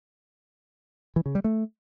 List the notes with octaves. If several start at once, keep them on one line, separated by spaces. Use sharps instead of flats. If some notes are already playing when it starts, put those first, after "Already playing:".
E3
C#3
G3
A3